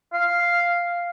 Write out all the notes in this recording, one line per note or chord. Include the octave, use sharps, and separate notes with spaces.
F5